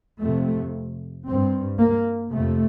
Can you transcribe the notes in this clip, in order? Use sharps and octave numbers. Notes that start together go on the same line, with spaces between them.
F2 C3 A3
G2 C4
A#3
F2 C3 A3